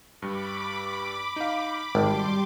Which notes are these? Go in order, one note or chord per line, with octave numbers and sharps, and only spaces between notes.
G2 G3 B5 D6
D#4 F5
G#1 G3 G5 A5 C6 D6